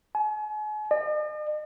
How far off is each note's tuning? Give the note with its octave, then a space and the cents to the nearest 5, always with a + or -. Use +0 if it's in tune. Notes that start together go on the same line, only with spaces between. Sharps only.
G#5 +40
D#5 -45